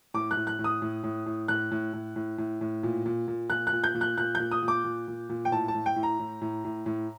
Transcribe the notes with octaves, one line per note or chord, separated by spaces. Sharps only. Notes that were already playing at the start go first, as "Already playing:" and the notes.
A2 D6
F#6
A2
F#6
A2
D#6
A2
A2
A2
A2 F#6
A2
A2
A2
A2
A2
A#2
A#2
A#2
A#2 F#6
F#6
A#2
G6
A#2
F#6
A#2 F#6
A#2 G6
D#6
A#2
D6
A#2
A#2
A#2
G5
A2 A5
A5
A2
G5
A2
A#5
A2
A2
A2
A2